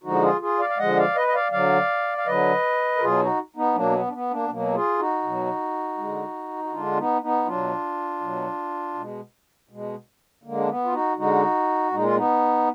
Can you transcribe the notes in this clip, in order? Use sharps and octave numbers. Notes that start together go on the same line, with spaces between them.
D3 F3 G#3 D#4 F#4
F4 G#4
F4 G#4
D5 F5
F5
D3 F3 G#3 D#5 F#5
D5 F5
B4 D#5
D#5
D5 F5
D3 F#3 D5 F5
F5
D3 F#3 B4 D#5
A#4
B2 F#3 F4 G#4
D#4 F#4
B3 D#4
B2 F#3 A#3 D4
B3
D4
B3
A#3 D4
B3
B2 F#3 A#3
F4 G#4
D#4 F#4
B2 F#3
D3 G#3
F#4
D3 G#3 D4 F4
B3 D#4
B3 D#4
B2 F#3 D4 F4
B2 F#3
B2 G#3
B2 G#3
D3 G#3 A#3
D4
B3
F4
D#4 F#4
D3 G#3 D#4 F#4
A#2 G#3 D#4
F4
B3 D#4